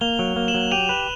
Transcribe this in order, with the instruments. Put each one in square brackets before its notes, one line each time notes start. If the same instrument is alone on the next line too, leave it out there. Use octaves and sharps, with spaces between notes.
[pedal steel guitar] A#3 [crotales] F7 G7
[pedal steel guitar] F#3
A#3
[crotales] E7 F#7
[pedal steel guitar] F#3
[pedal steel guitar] G4 [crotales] D#7 F7
[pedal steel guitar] B4